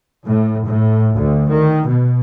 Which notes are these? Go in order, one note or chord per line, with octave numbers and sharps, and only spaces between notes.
A2
A2
D2
D#3
B2